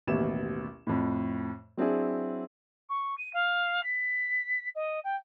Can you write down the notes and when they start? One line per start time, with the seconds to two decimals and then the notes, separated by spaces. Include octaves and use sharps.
0.07 A1 D#2 B2 E5 E7
0.87 F2 A2
1.77 F#3 C4 D4 E4 G#4
2.89 C#6
3.18 D#7
3.33 F5
3.83 B6
4.75 D#5
5.04 G5